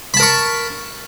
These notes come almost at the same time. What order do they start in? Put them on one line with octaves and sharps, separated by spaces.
B5 A5 A#4 C#6